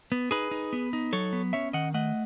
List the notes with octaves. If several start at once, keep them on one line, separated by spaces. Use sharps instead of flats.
B3
D#4 G#4 B4
D#4
B3
D#4
F#3 A4 C#5
B3
C#4 C#5 E5
D#3 D#5 F#5
A3 D#5 F#5